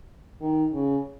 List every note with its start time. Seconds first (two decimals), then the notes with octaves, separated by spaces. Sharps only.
0.41 D#3
0.73 C#3